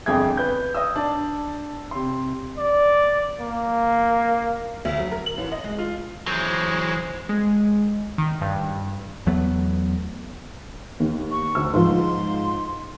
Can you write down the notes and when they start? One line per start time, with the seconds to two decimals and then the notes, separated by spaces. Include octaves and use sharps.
0.06 G1 F2 G#4 G5 G#6
0.37 B4 G6
0.74 D#5 D#6 E6
0.96 D4 D5 A5
1.91 C3 C6
2.58 D5
3.41 A#3
4.85 D2
4.98 F#3
5.11 A#4
5.26 F#7
5.37 A1
5.52 D#5
5.64 G#3
5.78 F4
6.27 E3 F#3 G#3 C5
7.29 G#3
8.18 D#3
8.41 G2
9.26 E2 F#3 A3 B3
11.00 D#2
11.31 C#6
11.55 D2 E6
11.74 G#2 F3 C6